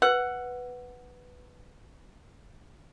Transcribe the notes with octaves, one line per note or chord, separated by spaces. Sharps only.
B4 F#5